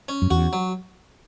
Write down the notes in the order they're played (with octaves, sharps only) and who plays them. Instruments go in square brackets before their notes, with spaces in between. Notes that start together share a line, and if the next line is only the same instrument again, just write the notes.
[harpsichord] C#4
[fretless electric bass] F#2
[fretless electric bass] E2 [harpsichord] F#4
[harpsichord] F#3